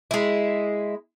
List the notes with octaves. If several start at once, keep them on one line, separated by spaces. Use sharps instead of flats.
G#3 E4